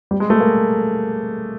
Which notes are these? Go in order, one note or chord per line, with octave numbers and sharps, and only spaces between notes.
G3
G#3
A3
A#3